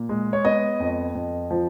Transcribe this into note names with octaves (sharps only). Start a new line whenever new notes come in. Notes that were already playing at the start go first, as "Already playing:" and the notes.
Already playing: A#2
G#3
C#5
B3 D#5
F2
F2
F3